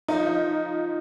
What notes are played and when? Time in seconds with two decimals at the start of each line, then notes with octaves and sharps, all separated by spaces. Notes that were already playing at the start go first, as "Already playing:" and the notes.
0.08 F3 D#4
0.26 F3